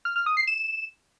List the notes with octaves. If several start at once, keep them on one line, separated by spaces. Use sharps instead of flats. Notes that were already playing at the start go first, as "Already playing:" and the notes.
F6
F6
D#6
C7
E7